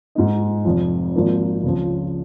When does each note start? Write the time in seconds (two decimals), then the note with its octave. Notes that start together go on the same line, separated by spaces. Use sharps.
0.15 G#2 G#3 D#4
0.64 F1 F2 F3
1.15 G#1 G#2 F3 A#3 D#4
1.64 C#2 C#3 F3